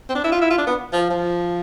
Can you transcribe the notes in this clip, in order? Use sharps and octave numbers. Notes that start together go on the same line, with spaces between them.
C4
D4
E4
F4
E4
F4
D4
B3
F3
F3